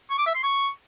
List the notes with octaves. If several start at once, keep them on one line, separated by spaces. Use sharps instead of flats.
C#6
D6
E5
C6
C#6